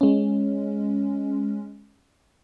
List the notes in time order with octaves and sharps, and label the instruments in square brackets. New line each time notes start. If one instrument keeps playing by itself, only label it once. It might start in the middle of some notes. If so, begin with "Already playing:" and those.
[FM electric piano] G#3 C#4